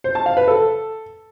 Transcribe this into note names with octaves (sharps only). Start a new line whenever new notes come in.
C5
A5
F5
B4
A4